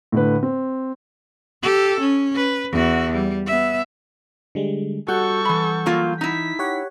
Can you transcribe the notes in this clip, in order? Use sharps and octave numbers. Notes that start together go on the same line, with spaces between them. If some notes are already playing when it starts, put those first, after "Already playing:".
A2 D3 B4
C4
G4 A4
C#4
B4
E2 F#4
G3
B3 E5
D3 G3 G#3
G3 F#4 A4 F#5 C#6 G6
E3 B5
F#3 A#3 F4
D#4 E4 B6
G4 C#5 F#5